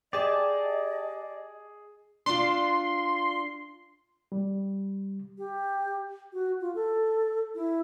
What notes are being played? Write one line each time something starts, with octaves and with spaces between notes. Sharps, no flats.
G4 G#4 D5 D#5 G#5 A5
D4 F4 C6
G3
G4
F#4
F4
A4
E4